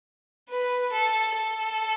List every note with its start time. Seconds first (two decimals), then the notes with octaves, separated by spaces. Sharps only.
0.49 B4
0.93 A4
1.37 A4